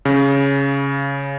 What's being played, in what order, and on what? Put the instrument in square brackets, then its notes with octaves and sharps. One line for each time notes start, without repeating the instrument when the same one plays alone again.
[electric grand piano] C#3